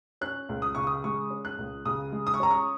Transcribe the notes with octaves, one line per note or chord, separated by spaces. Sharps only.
C#4 F#6
C#2
D#6
C#3 C#6
D#6
G#3 C#6
C#4
F#6
C#2
C#3 D#6
G#3
D#6
C#6
C#4 A#5
C#6